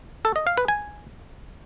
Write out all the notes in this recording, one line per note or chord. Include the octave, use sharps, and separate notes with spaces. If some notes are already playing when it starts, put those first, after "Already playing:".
A4
D#5
F5
B4
G#5